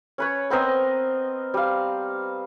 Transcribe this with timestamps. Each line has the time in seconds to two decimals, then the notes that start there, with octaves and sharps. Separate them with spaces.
0.18 C#4 B4 C#5
0.50 B3 C4 A#4 D#5
1.54 G3 F5